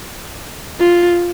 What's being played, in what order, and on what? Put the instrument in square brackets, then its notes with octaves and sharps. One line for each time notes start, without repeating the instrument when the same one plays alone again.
[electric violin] F4